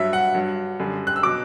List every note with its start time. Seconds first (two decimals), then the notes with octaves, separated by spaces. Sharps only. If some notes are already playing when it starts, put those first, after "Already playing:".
Already playing: G2 F#3 E5
0.13 F#5
0.35 G2 F#3
0.79 F#2 D3 G3
1.07 F#6
1.16 E6
1.23 B2 F#3 D6